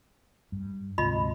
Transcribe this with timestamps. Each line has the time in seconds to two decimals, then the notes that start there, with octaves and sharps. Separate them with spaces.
0.52 G2
0.98 D2 G#2 C3 F4 D#5 B5